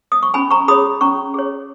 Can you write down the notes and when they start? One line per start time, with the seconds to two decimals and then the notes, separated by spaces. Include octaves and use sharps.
0.12 D#6
0.23 C#6
0.34 C#4 G#5 B5
0.51 A#5 C#6
0.68 G#4 C#5 B5 D#6
1.01 C#4 A#5 C#6
1.34 G#4 C#5